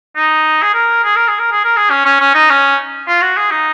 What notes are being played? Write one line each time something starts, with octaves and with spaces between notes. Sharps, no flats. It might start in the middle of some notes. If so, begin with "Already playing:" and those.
D#4
G#4
A#4
G#4
A#4
G#4
A#4
G#4
A#4
G#4
C#4
C#4
C#4
D#4
C#4
F4
F#4
G#4
D#4